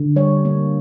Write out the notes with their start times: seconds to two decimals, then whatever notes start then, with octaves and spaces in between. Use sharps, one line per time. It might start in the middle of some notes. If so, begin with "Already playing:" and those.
Already playing: D3
0.16 G3 C#5
0.45 A#3